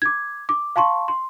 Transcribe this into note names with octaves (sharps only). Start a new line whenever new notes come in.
D6 G#6
D6
F5 A5 C6 C#6
C6